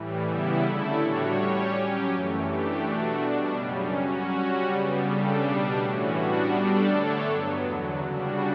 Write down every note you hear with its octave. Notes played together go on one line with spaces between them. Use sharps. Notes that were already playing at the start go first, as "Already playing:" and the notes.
Already playing: A2 E3 G3
C#3 E3 G3 B3 E4
D3 A3 E4 A4
A2 G3 D4 F#4 C#5
G3 C#4 G4 C#5
F#3 C#4 G4
F#2 E3 A3
E3 A3 D4 G4
B2 A3 D4 F#4
B2 G3 D4
F#2 C#3 G3 C#4
F#3 C#4 F#4
G3 C#4 F#4
C#3 G3 B3
C#3 G3 D4 A4
B2 G3 D4
A2 E3 A3 C#4 F#4
G3 B3 D4 F#4
G3 D4 A4 D5
D3 A3 D4 A4 C#5
G2 F#3 B3
E2 D3 F#3
C#3 G3 D4 F#4